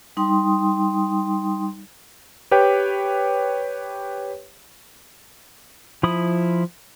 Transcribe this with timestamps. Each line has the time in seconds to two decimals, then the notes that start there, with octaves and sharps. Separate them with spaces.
0.17 G3 D#4 G5 C6 D#6
2.51 G4 B4 C#5 G5
6.03 F3 E4 B5 D#6